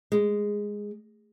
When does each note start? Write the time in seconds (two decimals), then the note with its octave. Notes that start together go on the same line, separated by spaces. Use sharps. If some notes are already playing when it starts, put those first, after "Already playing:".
0.12 G#3